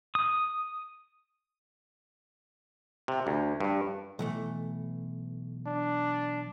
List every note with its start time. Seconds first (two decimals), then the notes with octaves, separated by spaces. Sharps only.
0.15 D#6
3.08 C3
3.27 D2
3.60 G2
4.19 B1 E3 A3
5.66 D4